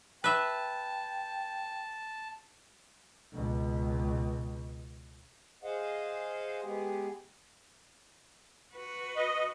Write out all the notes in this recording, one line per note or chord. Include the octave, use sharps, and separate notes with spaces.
B4 E5 G5 A5
C#2 B2
G#4 C5 D#5 F5 F#5
G#3 B3 G4 G#4
F#4 B4
D#5